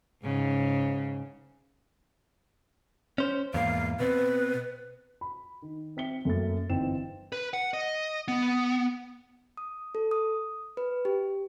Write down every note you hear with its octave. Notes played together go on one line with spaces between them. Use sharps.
G#2 C#3
C#4 C5
E2 G#2 A#3 F5
B2 C4 B4
B5
D#3
C4 E5 B6 C#7 G7
F#2 A3 A#3 C#4 A6
G1 E3 C4 D#4 E7
B4
F#5
D#5
B3
D#6
A4
D#6
B4
G4